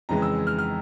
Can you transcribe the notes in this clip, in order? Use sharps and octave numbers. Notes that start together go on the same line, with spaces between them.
F2 C#3 E3 G#3 A#5
E6
F6
F6